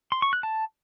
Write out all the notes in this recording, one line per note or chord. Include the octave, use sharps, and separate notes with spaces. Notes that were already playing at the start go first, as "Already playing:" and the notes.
C6
C#6
F#6
A5